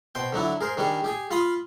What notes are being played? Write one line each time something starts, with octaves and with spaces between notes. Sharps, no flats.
B2 C5 G5
D3 F#3 D4 E4
G#4 A#4 C5
D#3 G3 D4 G#4
G4 G#4 G#5
F4 F5 B5 C6 D#6